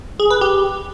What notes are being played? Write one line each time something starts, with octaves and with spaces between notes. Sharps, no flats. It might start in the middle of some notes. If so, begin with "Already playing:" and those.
G#4
B4
G4